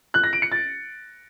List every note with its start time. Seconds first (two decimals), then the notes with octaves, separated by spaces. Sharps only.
0.14 F#6
0.24 A#6
0.33 D7
0.42 C#7
0.52 A6